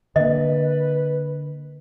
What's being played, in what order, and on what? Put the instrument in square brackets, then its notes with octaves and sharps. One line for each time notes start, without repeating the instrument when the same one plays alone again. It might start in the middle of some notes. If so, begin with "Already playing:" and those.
[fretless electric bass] D3 A#3 [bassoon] B4 [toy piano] D#5